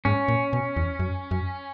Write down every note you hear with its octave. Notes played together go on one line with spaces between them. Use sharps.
G#2 C#4
A#2
B2
E2
F#2
F#2